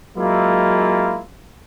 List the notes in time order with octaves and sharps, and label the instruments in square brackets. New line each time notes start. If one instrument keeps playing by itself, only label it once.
[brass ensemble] F#3 G#3 A#3 E4 F4